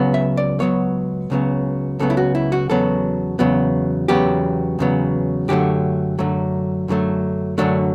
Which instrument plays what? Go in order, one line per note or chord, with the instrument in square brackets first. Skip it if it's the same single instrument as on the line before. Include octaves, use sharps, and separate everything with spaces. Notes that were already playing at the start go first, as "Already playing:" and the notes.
Already playing: [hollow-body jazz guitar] C#2 C#3 F#3 B3
E5
D5
C#2 C#3 F#3 B3 C#5
C#2 C#3 F#3 B3
C#2 C#3 F#3 B3 A4
E4
F#4
E4
F#4
E2 C#3 F#3 B3 A4
E2 C#3 F#3 B3
E2 C#3 F#3 B3 G4
E2 C#3 F#3 B3
F#2 D3 F#3 A3 G4
F#2 D3 F#3 A3
F#2 D3 F#3 A3
F#2 D3 F#3 A3 D4